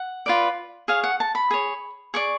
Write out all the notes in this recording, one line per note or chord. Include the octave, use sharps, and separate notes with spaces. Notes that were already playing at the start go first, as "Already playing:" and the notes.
Already playing: F#5
F4 B4 D5
G#4 C#5 F5
F#5
A5
B5
G#4 C#5
G#4 D5 C#6